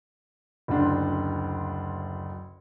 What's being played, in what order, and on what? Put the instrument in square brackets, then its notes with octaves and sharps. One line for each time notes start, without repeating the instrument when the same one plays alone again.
[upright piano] F#1 D2 D4 C6